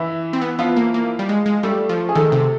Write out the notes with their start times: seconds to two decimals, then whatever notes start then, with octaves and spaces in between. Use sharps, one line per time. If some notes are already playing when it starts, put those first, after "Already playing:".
Already playing: E3 E4
0.33 C4
0.42 B3
0.59 F3 B3 F4
0.76 A#3
0.94 A#3
1.19 G3
1.29 G#3
1.46 G#3
1.63 G3 A3 A4
1.89 F3
2.09 G#4
2.15 D#3 A3 A4
2.32 C3